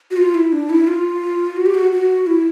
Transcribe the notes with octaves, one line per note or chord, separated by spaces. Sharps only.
F#4
F4
E4
D4
E4
F4
F#4
G4
F#4
F#4
E4